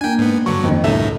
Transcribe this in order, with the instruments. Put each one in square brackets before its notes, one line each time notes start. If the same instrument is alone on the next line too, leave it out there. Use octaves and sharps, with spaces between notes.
[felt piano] A#3 D4 [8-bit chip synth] G5 G#5
[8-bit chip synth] G#2 B3
[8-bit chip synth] G2 D3 F#3 [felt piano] C#6
[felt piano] F#1 F2 D#3
[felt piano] C#2 A4 E5 [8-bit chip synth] F#2 A2 D#4